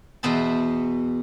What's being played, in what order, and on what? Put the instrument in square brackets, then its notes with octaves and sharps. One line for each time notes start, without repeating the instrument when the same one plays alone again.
[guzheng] E2 B2 B3 C5 A5